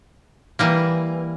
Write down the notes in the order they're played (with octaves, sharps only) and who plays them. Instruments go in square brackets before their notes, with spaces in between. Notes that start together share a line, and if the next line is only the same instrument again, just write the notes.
[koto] E3 G3 A#3